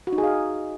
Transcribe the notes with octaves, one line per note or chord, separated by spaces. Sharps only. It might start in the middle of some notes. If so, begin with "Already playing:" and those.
F#4
D#4
G#4
F5